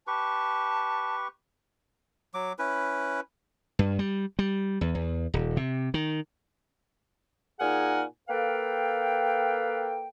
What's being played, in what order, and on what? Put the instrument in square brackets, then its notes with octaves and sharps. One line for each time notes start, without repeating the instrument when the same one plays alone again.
[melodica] G4 B4 C#6 [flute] A5
[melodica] F#3 D6
C#4 E4 B4
[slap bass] G2
G3
G3
E2
E2
D#1
C3
D#3
[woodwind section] A#2 D#4 G#4 F#5 G#5 F6
A#3 A4 B4 F5 G5